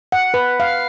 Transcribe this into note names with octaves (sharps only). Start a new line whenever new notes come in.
F#5
B4
F5